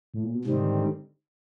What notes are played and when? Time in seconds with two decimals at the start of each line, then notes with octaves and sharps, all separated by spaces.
0.14 A2
0.24 A#2
0.35 B2
0.45 G#2 C3 D#3 G3 C4
0.59 D3
0.72 D3